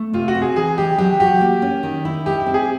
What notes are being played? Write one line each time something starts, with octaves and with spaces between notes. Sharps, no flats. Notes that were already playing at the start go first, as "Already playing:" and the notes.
Already playing: A3
C3 F4
F#4
C4
G#4
E3 G#4
G#3 G4
F#3 G4
F#4 G4
A#3
C#4
D#3
E4
G#3 G4
G4
C4
G#4